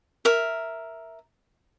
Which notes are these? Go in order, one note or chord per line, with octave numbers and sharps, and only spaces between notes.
A#4 E5